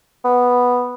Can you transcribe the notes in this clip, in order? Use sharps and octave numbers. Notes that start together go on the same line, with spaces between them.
B3